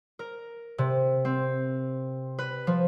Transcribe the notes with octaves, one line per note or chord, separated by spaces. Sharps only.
A#4
C3
C4
B4
F3